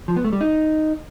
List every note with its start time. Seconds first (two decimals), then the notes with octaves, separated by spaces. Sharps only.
0.08 F3
0.16 B3
0.24 A3
0.33 G3
0.41 D#4